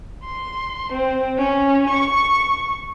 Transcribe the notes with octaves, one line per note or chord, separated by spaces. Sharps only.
C6
C4
C#4
C#6